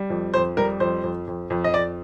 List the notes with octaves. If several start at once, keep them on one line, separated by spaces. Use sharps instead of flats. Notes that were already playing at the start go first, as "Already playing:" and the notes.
Already playing: G3
F2
F2 C5
G3 A#4
F2 C5
F2
F2
F2
D#5
F2 D5